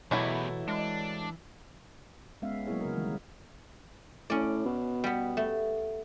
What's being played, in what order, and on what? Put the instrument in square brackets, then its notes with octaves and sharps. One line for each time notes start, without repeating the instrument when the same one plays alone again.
[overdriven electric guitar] E2 G4 [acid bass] B2 [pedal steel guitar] E3 B5 [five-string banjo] F#3 A3 E4
[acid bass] G#3 [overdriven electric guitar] D4
[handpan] G#3 B3 C#4 E5 F5
F#3 A#3 B3 E4 G#4 C#5
C#3 A#4
D#3 E3 G3 G#3
[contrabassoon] A2 [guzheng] C#4 D5
[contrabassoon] B2
[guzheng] G3 B3
A3